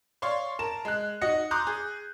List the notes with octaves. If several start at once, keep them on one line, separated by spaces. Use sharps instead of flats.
C#5 D5 F5 C6 C#6
A#4 A5 E7
G#3 F#6
D#4 F#4 D#5 A#6 C#7
A#5 C6 D6 D#6 F#6 G6
G#4